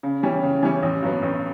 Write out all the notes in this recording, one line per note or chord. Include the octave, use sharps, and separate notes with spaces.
C#3
E3 G3 C#4
C#3
E3 G3 C#4
A1
G2 F#3 B3
A1